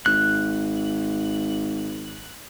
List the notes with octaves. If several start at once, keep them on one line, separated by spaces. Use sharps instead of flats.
G#1 F#6